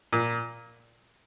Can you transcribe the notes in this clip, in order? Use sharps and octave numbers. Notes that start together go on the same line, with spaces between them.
A#2